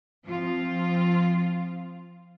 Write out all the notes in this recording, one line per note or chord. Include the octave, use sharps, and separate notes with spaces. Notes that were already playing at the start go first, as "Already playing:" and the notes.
F3 C4 F4